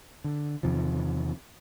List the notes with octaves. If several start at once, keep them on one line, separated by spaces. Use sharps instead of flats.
D3
E2 C3 D#3 F3